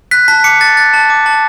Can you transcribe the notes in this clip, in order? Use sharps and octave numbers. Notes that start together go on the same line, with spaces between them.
F#6 B6
A5 B6
D6 C#7
A5 A6
F#6 A6
A5
D6
A5